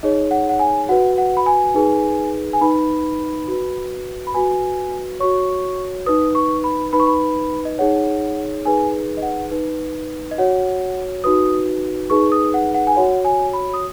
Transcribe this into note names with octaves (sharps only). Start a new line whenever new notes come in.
D#4 G#4 C#5 D#5
F#5
F#5
G#5
F#4 B4 F#5
F#5
B5
G#5
D#4 G#4 B4
G#5
D#4 B4 B5
F#4 B4
B5
F#4 B4 G#5
F#4 C#5 C#6
D#4 B4 D#6
C#6
B5
D#4 B4 B5
C#6
B5
D#5
D#4 G#4 C#5 F#5
D#4 G#4 B4 G#5
D#5
F#5
D#4 B4
D#5
F#4 C#5 F#5
D#4 F#4 B4 D#6
D#4 G#4 B4 C#6
D#6
F#5
F#5
G#5
F#4 C#5 F#5
G#5
B5
D#6